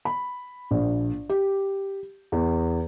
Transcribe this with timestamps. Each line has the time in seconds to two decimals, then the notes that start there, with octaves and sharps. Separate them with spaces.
0.05 B5
0.71 A#1
1.29 G4
2.32 E2